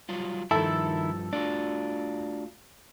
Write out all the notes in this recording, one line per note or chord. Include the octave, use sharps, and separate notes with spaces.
F#3 G3 F4
G2 D#3 F3 E4 A4
A3 D4 F4 F#4